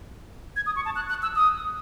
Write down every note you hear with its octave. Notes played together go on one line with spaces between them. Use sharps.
G#6
D#6
C#6
A5
F#6
F#6
E6
D#6